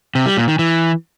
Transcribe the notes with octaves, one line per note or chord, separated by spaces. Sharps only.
C3
G3
A#2
D#3
E3